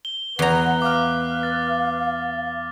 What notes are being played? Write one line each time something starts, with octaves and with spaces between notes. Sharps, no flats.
G7
E2 B4 F#5 A#5
F5 D6 F6
A6